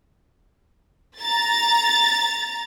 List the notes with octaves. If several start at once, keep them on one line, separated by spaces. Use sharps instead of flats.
A#5 A6